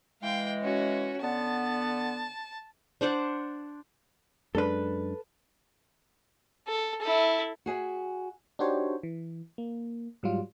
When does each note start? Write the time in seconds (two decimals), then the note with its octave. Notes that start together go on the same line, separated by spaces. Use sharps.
0.22 E3 G#3 F5 G5
0.60 C#4 F#4
1.22 D3 B3 A5
3.01 D4 C5 D5 F#5
4.55 F#2 G#3 D4 A4 B4
6.68 A4
7.01 E4 A4
7.66 F#4 G#4 E5 G#5
8.59 D4 D#4 F#4 G4 C5 C#5
9.03 E3
9.58 A#3
10.23 G#2 F#3 G3 F4